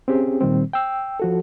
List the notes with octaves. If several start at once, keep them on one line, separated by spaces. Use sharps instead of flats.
C4 C#4 G4 G#4
A#2 D#3 G3 C4
G5 E6
F3 F#4 A4